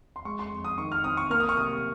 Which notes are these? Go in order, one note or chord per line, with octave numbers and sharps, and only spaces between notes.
C6
G#3 C#6
C6
F2
D#6
D#3 C#6
F6
C4 D#6
C#6
A#3 F6
D#6
C#6
C3 D#6